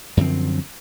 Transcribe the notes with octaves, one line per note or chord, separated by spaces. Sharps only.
F#2 D3 F3 C4